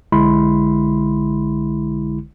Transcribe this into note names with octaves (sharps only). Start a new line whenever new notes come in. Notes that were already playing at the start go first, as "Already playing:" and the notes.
B1 D3 G#3 E4 B5 C6